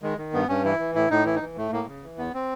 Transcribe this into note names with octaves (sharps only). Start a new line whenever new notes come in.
D#3 G#3
D#3
G2 B3
G2 C#4
E3 E4
E3
A2 E4
A2 D#4
E3 E4
D#4
E3
A2 A3
A2 A#3
C#3
E3
E2 B3
C4